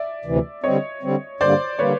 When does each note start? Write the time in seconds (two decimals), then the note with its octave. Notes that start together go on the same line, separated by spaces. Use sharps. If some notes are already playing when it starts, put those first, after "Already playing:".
Already playing: D5 E5
0.25 D2 C3 E3
0.64 D3 G3 C4 C#5 D#5
1.02 D3 G3 C4
1.41 G2 D3 G3 A#3 C5 D5
1.79 D3 G3 A#3 B4 C#5